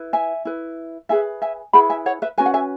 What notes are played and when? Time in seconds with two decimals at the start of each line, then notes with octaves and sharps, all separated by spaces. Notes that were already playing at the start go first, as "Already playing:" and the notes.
Already playing: E4 B4
0.13 E5 G#5
0.45 E4 B4
1.09 E4 G#4 B4 E5 G#5
1.42 E5 G#5
1.73 E4 G#4 B4 F#5 B5
1.90 E5 G#5
2.06 C#5 F#5
2.22 B4 E5
2.38 C#4 F#4 B4 G#5
2.46 F#5
2.54 E5 G#5